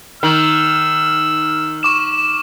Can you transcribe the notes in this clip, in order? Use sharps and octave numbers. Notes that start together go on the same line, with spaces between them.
D#3 E6 F6 F#7
C#6 D6 E7